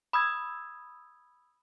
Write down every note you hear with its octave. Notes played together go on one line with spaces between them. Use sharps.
B5 D#6 E6 G#6